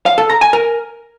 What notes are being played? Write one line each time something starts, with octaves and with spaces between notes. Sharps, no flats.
F5
A4
A#5
G#5
A#4